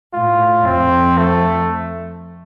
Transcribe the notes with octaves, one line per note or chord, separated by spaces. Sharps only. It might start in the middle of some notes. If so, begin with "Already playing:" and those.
A2 F4
F2 C4
A3